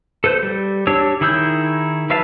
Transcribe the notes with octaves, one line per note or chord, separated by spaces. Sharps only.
A4 B4 C5 G6
G3
D4 G4 C#5 E6
D#3 E4 G#4 E6 G6
F#3 B4 E5 F5 A5